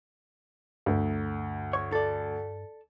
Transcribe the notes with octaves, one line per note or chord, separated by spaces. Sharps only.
D2 G2
C#5
A4 D5